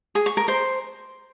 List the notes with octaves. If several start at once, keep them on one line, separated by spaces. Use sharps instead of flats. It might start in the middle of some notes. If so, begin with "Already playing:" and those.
G#4
C#6
A#4
C5